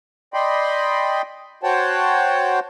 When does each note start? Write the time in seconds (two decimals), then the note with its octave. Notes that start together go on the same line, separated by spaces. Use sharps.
0.34 D5 D#5 G5 B5 C6
1.63 F#4 C5 C#5 F#5 G5 A5